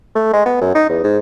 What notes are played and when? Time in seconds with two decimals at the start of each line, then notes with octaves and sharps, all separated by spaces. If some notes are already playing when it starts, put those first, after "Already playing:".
0.15 A3
0.33 G#3
0.45 B3
0.61 F#2
0.75 D#4
0.89 E2
1.04 G#2